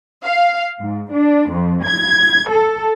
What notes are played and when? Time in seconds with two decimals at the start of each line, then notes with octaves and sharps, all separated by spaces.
0.24 F5
0.80 G#2
1.12 D4
1.51 F2
1.84 G#6
2.49 A4